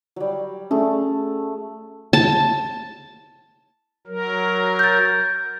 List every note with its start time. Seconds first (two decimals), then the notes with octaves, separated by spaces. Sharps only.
0.16 F#3 G3
0.71 A3 C#4 G#4
2.13 A5
4.07 F#3 A#4
4.79 G6 A6